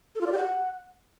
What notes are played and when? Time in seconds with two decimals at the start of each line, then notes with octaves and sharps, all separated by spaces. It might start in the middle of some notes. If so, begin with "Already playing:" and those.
0.15 A4
0.21 F4
0.26 D5
0.32 G4
0.38 F#5